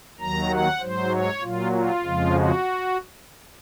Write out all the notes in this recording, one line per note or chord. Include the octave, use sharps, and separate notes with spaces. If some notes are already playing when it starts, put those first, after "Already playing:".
D#2 D#3 F#3 A#5
F#5
G#2 F#3 C5
C#5
A#2 F#3 F4
F4
F2 C#3 F3 G#3
F#4